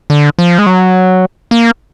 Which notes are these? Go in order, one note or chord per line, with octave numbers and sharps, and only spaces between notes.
D3
F3
G#3
F#3
A#3